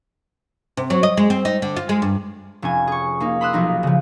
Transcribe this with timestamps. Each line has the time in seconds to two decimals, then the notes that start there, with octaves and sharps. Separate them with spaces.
0.77 C3
0.90 F#3
1.03 D#5
1.17 G#3
1.30 C4
1.45 D#4
1.62 D3
1.77 F4
1.89 G#3
2.02 G2
2.62 F1 C#4 G#5
2.87 G#4 C#6
3.20 A#3 D#4
3.41 B5 C6 D#6 E6 F#6
3.53 B1 F3 D#4
3.83 C#3 F3